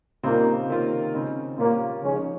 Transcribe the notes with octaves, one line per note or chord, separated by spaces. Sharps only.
A#2 C#3 G3 A#3 C4 D#4
C3 D#3 A#3 C#4 F4
C#3 G#3 C4 D#4
A#2 G3 A#3 C#4 F4
C#3 F3 G#3 C#4 D#4